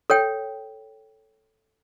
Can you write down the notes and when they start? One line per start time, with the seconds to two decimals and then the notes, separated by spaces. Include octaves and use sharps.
0.10 A4 C#5 G5